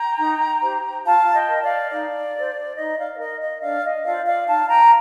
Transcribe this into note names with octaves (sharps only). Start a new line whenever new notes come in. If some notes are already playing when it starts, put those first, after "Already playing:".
Already playing: G5 A#5
D#4
G4 C5
F4 F5 A5
D#5 G5
A#4
D5 F5
D#4 D5
A4
C5
D#4 D#5
D5 F5
D5
A#4 D#5
D#5
D4 D5 F5
D#5
F4 A4 C5 D5 F5
D5 F5
D#4 F5 A5
G5 A#5